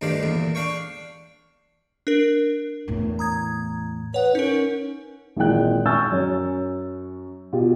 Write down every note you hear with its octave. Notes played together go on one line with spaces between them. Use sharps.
D2 G2 D#3 D4 G4 F5
E2 A#2
D4 F5 G5 C#6
D4 A#4
E2 A2
A#5 D#6 G#6
B4 C#5 F#5
C#4 D#4 A#4
G#1 A#2 E3 G#3 G5 F#6
G#5 C#6 E6 G6 A6
F#2 C#5
B2 F4 G4